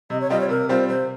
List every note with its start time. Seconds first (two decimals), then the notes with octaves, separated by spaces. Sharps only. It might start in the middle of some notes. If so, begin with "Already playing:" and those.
0.10 C3 D#5
0.21 C#5
0.30 G3 C4 F4 D#5
0.40 C#5
0.49 C3 A#4
0.69 G3 C4 F4 C5
0.88 C3 C5